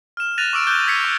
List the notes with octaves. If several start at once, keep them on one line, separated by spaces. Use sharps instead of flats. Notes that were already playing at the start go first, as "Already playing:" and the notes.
F6 E7
F#6 A6 A#6 D#7 F7
C#6 D6 E6 D7
D6 F#6 G6 E7 G7
E6 G#6 B6 C#7
C#6 G6